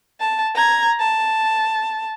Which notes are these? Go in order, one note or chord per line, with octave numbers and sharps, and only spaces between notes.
A5
A#5 G#6
A5